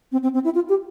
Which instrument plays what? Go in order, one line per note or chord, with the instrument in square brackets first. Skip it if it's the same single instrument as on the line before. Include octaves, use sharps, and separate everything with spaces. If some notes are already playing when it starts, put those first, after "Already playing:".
[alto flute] C4
C4
C4
E4
F4
G4